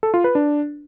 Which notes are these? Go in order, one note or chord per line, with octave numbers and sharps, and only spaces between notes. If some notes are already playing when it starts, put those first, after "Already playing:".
A4
F4
B4
D4